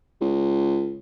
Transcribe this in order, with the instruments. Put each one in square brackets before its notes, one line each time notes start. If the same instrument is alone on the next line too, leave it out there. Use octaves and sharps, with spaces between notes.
[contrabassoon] C#2